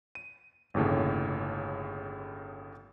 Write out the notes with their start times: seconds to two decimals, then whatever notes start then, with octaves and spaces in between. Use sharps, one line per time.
0.15 D#7
0.74 G1 D#2 A2 C#3